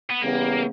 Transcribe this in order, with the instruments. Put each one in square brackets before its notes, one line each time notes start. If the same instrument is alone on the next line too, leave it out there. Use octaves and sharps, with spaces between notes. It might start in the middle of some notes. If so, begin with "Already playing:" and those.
[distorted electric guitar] B3
[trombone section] C#3 E3 G3 B3 [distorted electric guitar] A#3